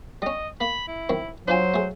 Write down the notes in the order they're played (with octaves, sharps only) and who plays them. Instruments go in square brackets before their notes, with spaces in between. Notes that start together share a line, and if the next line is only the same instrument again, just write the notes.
[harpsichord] G3 C#4 [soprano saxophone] D#5
[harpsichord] A#3 [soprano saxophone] B5
[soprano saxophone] E4
[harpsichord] F#2 D#3 C4
[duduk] F#3 [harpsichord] D4 F4 G#5 [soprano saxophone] C5
[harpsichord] A3 G#4